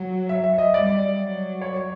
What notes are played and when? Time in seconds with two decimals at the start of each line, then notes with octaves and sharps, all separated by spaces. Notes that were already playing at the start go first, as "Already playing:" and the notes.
Already playing: F#3
0.29 E5
0.44 E5
0.58 D#5
0.74 G3 D5
1.17 F#3
1.61 C#5